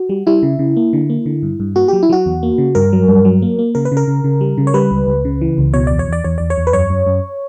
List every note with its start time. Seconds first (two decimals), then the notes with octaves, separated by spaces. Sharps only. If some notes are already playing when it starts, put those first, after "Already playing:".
Already playing: F#4
0.09 G3
0.27 G3 E4
0.43 C#3
0.59 C#3
0.77 A#3
0.93 D3
1.10 A#3
1.26 D3
1.43 G2
1.60 G2
1.76 A#3 F#4
1.88 F#3 G4
2.03 E4
2.09 F#3 F#4
2.26 E2
2.43 A#3
2.58 C#3
2.75 G2 A#4
2.93 F#3
3.08 G2
3.25 F#3
3.42 A#3
3.59 A#3
3.75 C#3 A#4
3.85 B4
3.92 C#3
3.97 A#4
4.07 C#3
4.24 C#3
4.41 G3
4.58 C#3
4.67 C#5
4.74 G3 B4
4.91 C#2
5.07 C#2
5.25 C#3
5.41 E3
5.58 C#2
5.73 B2 C#5
5.87 E2 D5
5.99 C#5
6.08 E2 D5
6.24 E2 C#5
6.38 E2 D5
6.50 C#5
6.58 E2
6.67 B4
6.73 F#2 C#5
6.90 F#2
7.07 F#2